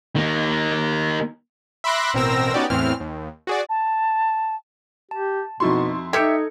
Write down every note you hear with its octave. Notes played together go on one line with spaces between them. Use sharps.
D#3 A#3
E5 B5 C6 D6 F#6 A#6
A1 B2 C4 A#4 E6 A#6
B3 C#4 D#4 F#4 G4 D5
E2 A2 E3 C4 F6
D#2
F#4 G#4 D5
A5
G4 A5
F2 B2 D#4 E4 F#4 C6 C#6
D#4 G4 A4 E5 G#6 C#7